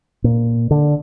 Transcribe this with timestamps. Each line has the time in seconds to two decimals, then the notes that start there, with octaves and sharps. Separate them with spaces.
0.24 A#2
0.71 D3